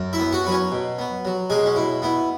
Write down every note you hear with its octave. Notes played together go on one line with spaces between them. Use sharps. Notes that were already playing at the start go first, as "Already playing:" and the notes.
Already playing: F#2
E4 E5
B3
F#4 F#5
F#3 B4
C#4 C#5
B2
B3
F#3
B2 G#3 G#4
C#4
B2 E4
B3 E4